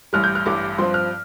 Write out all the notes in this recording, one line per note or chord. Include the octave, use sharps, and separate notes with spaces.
A1 G2 G3 F6
G6
F6
A1 G2 G3 D6
G2 F3 C4 C6
F6